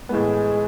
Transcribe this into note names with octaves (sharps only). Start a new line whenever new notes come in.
A2 E3 G#3 B3